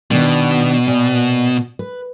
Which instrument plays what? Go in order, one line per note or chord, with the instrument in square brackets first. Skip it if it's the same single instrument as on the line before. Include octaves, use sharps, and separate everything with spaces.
[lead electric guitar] B2 [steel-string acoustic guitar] D#3 B3 D4
[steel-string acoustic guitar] A#2
B4